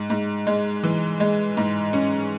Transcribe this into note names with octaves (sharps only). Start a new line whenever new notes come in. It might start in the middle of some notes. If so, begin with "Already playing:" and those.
Already playing: G#2
G#2
G#3
E3
G#3
G#2
C#4